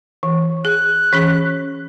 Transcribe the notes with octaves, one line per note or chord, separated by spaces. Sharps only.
E3
G#4 F#6
E3 C#4 G#4